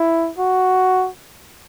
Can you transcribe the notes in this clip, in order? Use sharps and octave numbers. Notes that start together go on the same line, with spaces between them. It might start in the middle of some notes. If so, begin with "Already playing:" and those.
Already playing: E4
F#4